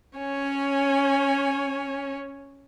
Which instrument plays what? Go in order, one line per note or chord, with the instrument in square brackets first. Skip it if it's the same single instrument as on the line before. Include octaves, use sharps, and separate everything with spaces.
[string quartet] C#4 C#5 G#5